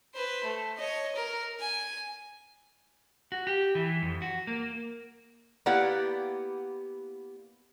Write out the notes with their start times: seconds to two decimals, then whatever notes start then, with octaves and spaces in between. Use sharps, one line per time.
0.14 B4 C5
0.44 A3
0.78 C#5 D#5
1.16 A#4
1.60 G#5
3.32 F#4
3.47 G4
3.75 E3
4.02 F2
4.22 F#4
4.47 A#3
5.66 A#3 B3 E4 G4 D5 F#5